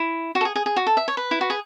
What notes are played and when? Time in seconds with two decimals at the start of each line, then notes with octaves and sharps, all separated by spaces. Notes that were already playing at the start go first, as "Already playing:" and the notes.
Already playing: E4
0.35 F#4
0.41 A4
0.45 G#4
0.56 G#4
0.66 G#4
0.76 F#4
0.87 A4
0.97 E5
1.08 C#5
1.17 B4
1.31 E4
1.41 F#4
1.50 G#4